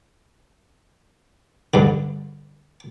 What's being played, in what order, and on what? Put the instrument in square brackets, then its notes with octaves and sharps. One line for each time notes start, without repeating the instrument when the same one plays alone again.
[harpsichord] G2 D3